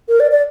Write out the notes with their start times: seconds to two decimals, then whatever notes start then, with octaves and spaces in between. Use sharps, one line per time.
0.09 A#4
0.20 D5
0.31 D5